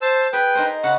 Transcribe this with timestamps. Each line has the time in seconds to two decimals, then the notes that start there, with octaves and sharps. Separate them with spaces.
0.02 C5 A5 E6
0.33 G#4 B4 G5
0.55 D#4 A#4 C5
0.83 C#3 F#5